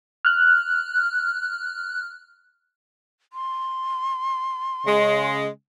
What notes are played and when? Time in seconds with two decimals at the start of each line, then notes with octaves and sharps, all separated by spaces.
0.25 F6 F#6
3.33 C6
4.85 C#3 G#3